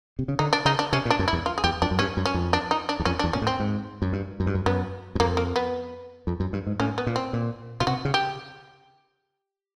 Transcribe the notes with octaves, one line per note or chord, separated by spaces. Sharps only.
C3
C#3
D3 D#4
D4
C#3 D#4
D4
C3 C#4
A#2
D4
F#2
E4
E2
F4
G#4
E2 G4
F2 D4
F#2
G2 C#4
F#2
C#4
F2
D4
D#4
D4
E2
F2 C#4
D4
E2
A#2 C#4
A2
C4
G#2
F#2
G2
F#2
G2
F#2
F#2 B3
F#2
F2 A#3
A#3
B3
F2
F#2
G2
G#2
A2 C#4
B3
A#2
C4
A#2
B2 F4
C3 F#4
C#3
G4